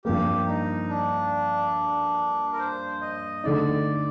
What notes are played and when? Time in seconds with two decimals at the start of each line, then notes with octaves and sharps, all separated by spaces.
0.05 G2 F3 A#3 G4
0.46 D#4
0.89 D4
2.53 A#4
2.59 C5
3.01 D#5
3.44 D3 A3 D#4 D5